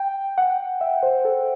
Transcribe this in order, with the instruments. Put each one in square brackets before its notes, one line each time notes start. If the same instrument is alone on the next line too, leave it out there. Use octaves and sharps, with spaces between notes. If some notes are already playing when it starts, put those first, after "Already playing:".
Already playing: [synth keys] G5
F#5
E5
C5
A4